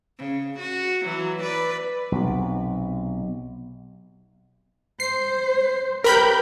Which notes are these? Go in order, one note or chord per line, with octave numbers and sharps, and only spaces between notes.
C#3
F#4
E3 F#3
B4 D5
B1 C3
C5 C7
G4 A#4 B4 B5 G6